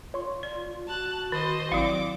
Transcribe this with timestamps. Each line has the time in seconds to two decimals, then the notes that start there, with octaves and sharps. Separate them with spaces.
0.14 F4 C#5 C6 C#6
0.43 D5
0.88 F#4 A5 F#6
1.32 D#3 C5 D#5
1.72 G#1 F#3 C4 E4 F5 D6 A6